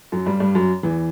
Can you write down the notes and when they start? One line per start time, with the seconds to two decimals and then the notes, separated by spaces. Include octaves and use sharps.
0.12 F#2 F#3
0.26 G2 G3
0.40 G2 G3
0.55 F#2 F#3
0.83 E2 E3